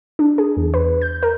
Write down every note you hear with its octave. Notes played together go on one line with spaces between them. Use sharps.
D4
G#4
E2
B4
G6
A#4